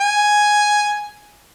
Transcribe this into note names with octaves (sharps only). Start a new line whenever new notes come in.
G#5